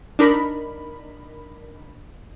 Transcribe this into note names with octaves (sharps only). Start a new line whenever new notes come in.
D4 D#4 A#4 B5